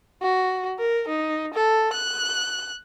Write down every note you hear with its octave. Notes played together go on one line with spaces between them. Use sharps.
F#4
A#4
D#4
A4
F#6